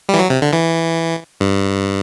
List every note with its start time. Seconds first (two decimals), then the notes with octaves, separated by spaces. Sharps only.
0.09 G3
0.14 E3
0.19 F#3
0.30 C3
0.42 D3
0.53 E3
1.40 G2